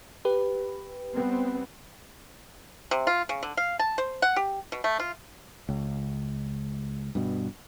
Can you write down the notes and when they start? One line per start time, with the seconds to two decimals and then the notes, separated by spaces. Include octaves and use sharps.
0.25 G4 B4
1.14 G3 B3 C4
2.91 C3
3.07 F4
3.29 C#3
3.43 D3
3.57 F5
3.79 A5
3.98 C5
4.22 F#5
4.36 G4
4.72 B2
4.84 A3
5.00 F4
5.69 C#2
7.15 G2 B2